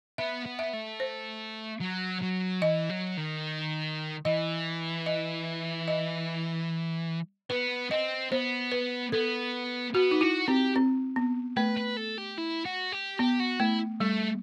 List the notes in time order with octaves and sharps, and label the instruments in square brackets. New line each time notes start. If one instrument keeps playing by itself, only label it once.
[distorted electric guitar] B3 [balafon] E5
[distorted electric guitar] B3
[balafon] E5
[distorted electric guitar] A3
[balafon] C5
[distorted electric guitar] F#3
F#3
[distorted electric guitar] E3 [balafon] D#5
[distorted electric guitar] F#3
D#3
[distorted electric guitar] E3 [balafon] D#5
[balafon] D#5
D#5
[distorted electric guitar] B3 [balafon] B4
[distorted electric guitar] C4 [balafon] D#5
[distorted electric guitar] B3 [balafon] C5
[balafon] B4
[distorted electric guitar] B3 [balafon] A4
[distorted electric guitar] B3 [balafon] F#4
[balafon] D#4
[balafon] E4 [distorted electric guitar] F#4
[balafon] C4 [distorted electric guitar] G4
[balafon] C4
B3
[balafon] A3 [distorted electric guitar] B4
[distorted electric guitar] B4
A4
G4
E4
F#4
G4
[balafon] B3 [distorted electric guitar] G4
[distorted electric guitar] F#4
[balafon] A3 [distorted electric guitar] E4
[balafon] G3 [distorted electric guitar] A3